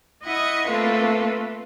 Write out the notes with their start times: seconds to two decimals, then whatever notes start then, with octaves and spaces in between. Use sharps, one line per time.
0.24 E4 D#5 F#5 C#6 D#6
0.68 A3 A#3 C4 F4 A4 B4